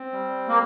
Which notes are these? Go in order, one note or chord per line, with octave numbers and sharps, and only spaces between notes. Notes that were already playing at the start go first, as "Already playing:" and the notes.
Already playing: C4
G3
A#3